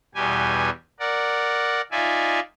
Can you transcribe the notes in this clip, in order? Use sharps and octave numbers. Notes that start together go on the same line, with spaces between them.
E2 B2 G3 G4 G#5
A#4 D5 F#5
D#4 F4 D5 E5 G#5